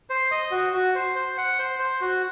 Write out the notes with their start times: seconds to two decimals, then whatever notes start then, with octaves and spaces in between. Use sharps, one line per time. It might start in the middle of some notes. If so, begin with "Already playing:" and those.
0.10 C5
0.31 D#5
0.51 F#4
0.73 F#4
0.95 C5
1.16 C5
1.37 F#5
1.59 C5
1.79 C5
2.01 F#4